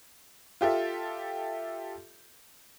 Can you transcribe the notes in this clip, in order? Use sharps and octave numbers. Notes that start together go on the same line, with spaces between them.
F4 G4 A4 E5